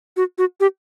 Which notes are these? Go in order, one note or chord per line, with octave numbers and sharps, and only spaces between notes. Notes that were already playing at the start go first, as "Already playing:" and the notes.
F#4
F#4
G4